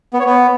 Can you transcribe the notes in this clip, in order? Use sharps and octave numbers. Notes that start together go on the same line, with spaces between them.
B3
C#5
B3